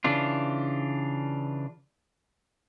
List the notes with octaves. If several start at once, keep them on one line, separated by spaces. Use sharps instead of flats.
C#3 E3 D4 F4